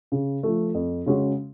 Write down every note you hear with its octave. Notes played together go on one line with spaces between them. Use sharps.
C#3
F3 A3
F2
C#3 G#3 C#4 F#4